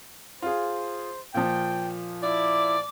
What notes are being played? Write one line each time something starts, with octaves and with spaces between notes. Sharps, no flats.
F4 G#4 C5
A#2 F3 G5
E4 D5 D6